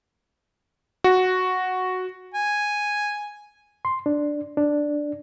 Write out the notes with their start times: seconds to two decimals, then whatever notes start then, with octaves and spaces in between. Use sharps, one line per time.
1.04 F#4
2.34 G#5
3.85 C6
4.06 D4
4.57 D4